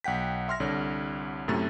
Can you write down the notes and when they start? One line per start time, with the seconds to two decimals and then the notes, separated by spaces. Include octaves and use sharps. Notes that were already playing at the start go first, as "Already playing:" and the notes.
0.04 B1 F#5 G5 B6
0.48 E5 C6 F6 A#6
0.60 C2 D3 C#5
1.48 F#2 A2 C3 A3 A6